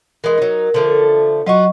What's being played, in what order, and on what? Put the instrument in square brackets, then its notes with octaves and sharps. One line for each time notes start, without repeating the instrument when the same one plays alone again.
[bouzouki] E3 G#3 [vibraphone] A#4
[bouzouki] F#3 D#4
D3 F3 A3
[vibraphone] F#3 D#5 C#6 [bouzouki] F4 F#4